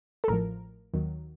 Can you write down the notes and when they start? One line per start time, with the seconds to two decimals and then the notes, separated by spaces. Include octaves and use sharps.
0.24 A4
0.28 A1 A2 F3 A#4
0.94 D#2 D#3 F#3